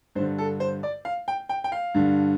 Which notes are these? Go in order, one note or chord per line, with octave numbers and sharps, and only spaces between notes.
G2 D3 C5
A4
C5
D5
F5
G5
G5
G5
F5
G2 D3